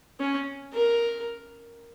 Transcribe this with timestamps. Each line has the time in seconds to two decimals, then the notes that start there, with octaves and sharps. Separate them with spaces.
0.20 C#4
0.74 A#4